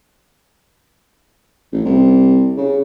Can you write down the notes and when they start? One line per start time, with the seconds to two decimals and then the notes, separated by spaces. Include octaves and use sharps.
1.73 A1
1.85 C2
2.57 C#3